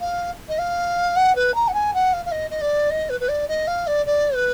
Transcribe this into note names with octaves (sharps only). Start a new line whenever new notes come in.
F5
D#5
F5
F#5
B4
A#5
F#5
G#5
F#5
F5
F5
D#5
D#5
D5
D#5
B4
B4
D5
D#5
F5
D5
D5
B4